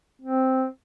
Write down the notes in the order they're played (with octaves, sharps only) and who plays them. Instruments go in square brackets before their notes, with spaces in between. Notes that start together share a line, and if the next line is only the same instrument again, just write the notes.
[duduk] C4